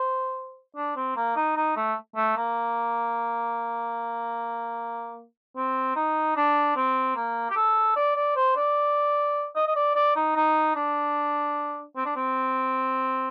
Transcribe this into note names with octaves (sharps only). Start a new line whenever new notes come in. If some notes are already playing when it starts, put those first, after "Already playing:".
Already playing: C5
D4
C4
A#3
D#4
D#4
A3
A3
A#3
C4
D#4
D4
C4
A#3
G4
A4
D5
D5
C5
D5
D#5
D#5
D5
D5
D#4
D#4
D4
C4
D4
C4